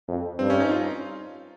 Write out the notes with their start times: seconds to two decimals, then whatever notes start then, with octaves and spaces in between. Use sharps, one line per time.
0.08 F2
0.39 G2 C4
0.50 C#4
0.60 D#4
0.71 F4